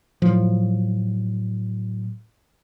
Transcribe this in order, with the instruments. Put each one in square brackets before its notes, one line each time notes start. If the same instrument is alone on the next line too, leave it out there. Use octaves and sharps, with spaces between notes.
[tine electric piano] A2 F#3 [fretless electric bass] F3